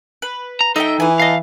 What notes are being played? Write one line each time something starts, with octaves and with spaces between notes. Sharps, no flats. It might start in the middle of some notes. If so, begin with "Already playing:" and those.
B4
A#5
D#4 A4 D#5 E5 G5
E3 G#5 D#6
D#5 F5 A5